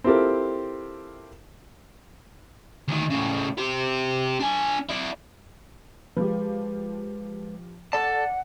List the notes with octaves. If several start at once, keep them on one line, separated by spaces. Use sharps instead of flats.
C4 E4 F4 G4 A4 A#4
D2 D#3
A2 C#3
G4 C5
D4 G#5
E4 D5
F3 G#3 G4 B4
A4 D5 F#5 A5